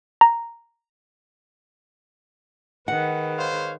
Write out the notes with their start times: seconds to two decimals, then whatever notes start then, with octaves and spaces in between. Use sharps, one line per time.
0.21 A#5
2.88 G#2 D#3 B4 F#5
3.38 C5 C#5 F5